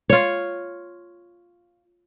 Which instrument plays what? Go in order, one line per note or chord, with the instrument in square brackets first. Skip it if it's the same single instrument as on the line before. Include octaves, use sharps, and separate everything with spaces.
[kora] F4 C#5